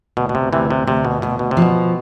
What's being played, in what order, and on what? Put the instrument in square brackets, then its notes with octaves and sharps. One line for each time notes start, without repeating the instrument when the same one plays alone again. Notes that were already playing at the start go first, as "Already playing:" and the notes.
[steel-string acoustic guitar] D2 [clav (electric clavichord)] B2
[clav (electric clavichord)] B2
C3
[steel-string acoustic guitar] D2 [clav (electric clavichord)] C3 E3
[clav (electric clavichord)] C3
[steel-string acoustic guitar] D2 [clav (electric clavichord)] C3
[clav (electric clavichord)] B2
[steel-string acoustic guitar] D2 [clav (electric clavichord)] B2
[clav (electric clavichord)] B2
C3
[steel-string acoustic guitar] F3
[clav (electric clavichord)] B2